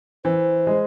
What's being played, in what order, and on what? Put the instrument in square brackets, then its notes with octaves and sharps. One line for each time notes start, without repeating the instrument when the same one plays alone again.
[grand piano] E3 [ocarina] C5
[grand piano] G#3